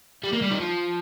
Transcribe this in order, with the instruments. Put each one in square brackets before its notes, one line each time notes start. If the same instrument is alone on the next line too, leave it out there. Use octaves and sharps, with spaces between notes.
[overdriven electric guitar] G3
A#3
G3
D#3
F3